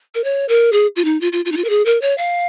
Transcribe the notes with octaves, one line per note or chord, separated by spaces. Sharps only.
A#4
C#5
A#4
G#4
F4
D#4
F4
F4
F4
D#4
F4
A#4
G#4
A#4
C#5
F5